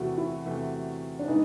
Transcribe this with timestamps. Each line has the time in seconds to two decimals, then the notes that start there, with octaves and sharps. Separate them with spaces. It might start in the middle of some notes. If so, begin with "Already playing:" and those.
Already playing: E2 C3 E3 A3 F#4
0.18 E4
0.45 E2 C3 E3 A3
1.19 D4
1.28 C#3 E3 G#3 B3 D#4